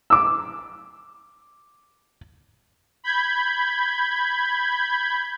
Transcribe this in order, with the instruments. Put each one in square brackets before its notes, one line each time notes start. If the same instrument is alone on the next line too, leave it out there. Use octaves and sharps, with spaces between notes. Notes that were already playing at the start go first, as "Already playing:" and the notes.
[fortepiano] D6 E6
[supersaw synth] B5 G6 G#6